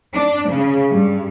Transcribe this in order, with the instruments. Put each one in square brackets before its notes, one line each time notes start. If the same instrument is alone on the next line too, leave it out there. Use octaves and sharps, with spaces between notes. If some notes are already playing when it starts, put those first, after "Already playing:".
[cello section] D4
C#3
G2